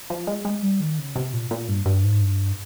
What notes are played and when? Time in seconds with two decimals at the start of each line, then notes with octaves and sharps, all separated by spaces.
0.10 F3
0.27 G#3
0.45 G#3
0.62 G3
0.80 D#3
0.98 C#3
1.16 C3
1.33 A#2
1.51 A#2
1.68 G2
1.86 G2
2.04 G#2
2.21 G2